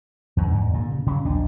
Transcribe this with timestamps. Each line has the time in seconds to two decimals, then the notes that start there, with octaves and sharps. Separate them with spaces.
0.37 E2 D3
0.52 E2 G#2
0.73 G2 A#2 D3
0.91 C#3
1.07 C#3 F#3 C#4
1.25 A#1 D#2 D4